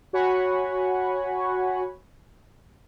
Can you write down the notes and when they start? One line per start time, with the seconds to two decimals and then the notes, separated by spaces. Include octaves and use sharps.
0.13 F#4 C#5 F#5 G#5 B5 C#6